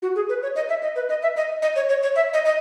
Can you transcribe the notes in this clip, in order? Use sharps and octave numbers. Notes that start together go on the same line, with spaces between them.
F#4
G#4
B4
C#5
D#5
E5
D#5
B4
D#5
E5
D#5
D#5
C#5
C#5
C#5
E5
D#5
D#5